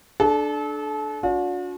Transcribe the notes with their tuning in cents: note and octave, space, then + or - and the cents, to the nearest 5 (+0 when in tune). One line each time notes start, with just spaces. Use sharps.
D4 +15 A4 -35
D4 -35 F#4 -45